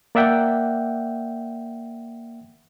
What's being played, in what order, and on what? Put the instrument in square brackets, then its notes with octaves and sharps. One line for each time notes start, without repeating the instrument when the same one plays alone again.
[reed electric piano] A#3 D5 E5 F#5 G5